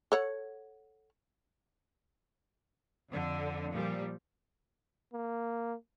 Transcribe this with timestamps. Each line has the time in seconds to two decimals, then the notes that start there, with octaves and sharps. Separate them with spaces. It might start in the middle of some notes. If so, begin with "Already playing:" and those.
0.12 A4 C#5 F#5
3.10 F2 D3
3.72 A#2 F3 G3
5.13 A#3